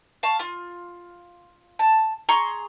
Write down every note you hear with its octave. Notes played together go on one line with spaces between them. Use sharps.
F5 A5 C#6
F4
A5
G#4 A#5 C6 C#6